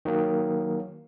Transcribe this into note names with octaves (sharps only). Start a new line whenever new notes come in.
D#3 F#3 A#3